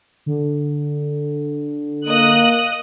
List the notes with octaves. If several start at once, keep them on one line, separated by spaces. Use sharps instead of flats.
D3
A#3 D#5 D#6 F#6